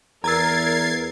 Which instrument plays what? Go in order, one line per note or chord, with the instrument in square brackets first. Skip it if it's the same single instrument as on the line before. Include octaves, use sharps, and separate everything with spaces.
[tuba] E2 [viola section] A#4 [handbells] A#5 E6 [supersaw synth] G#6 A6 C7